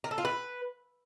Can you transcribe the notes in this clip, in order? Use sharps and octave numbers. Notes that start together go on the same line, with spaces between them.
A#4
A4
F4
B4